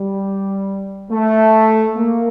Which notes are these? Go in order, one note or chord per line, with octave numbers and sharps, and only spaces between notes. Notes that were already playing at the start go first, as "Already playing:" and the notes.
Already playing: G3
A3
A#3